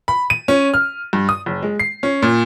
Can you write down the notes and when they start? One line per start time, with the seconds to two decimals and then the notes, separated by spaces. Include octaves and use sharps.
0.08 B5
0.30 D#7
0.48 C#4
0.74 F6
1.13 G2
1.29 D#6
1.46 F#1
1.63 G#3
1.80 C7
2.03 C#4
2.22 A#2